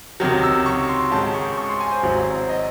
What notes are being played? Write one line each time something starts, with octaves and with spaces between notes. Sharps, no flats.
C#2 C3 D#3 F#3
E6
C#6
C6
G#2 D#3 G#3 C#4 A5
C#6
C#6
C6
G#5
C5
G#1 G#2 F#3 C4 E4
D#5